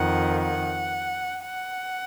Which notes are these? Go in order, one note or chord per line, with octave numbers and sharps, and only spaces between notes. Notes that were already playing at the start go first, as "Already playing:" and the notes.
Already playing: F2 D#3 F#5
F#5
F#5